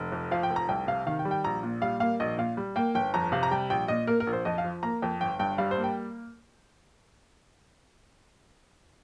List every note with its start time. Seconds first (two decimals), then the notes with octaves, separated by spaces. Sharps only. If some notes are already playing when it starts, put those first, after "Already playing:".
Already playing: F1
0.12 F2
0.31 F3 F5
0.43 G5
0.50 F1
0.56 A#5
0.69 C2 G5
0.87 C3 F5
1.07 D#3 F5
1.19 G5
1.25 G3
1.31 G5
1.44 A#1 A#5
1.63 A#2
1.81 G3 F5
2.00 A#3 F5
2.20 A#1 D#5
2.38 A#2 F5
2.57 G3
2.76 A#3 G5
2.95 G1 G5
3.14 F2 A#5
3.32 C3 F5
3.43 A#5
3.51 G3 G5
3.70 A#1 G5
3.88 A#2 D#5
4.07 A#3 A#4
4.20 A#4
4.27 A#1
4.33 C5
4.45 F2 D#5
4.58 F5
4.64 F3
4.83 A#3 A#5
5.02 F2 G5
5.21 G1 G5
5.39 G2 G5
5.58 G3 F5
5.71 C5
5.77 A#3
5.84 G5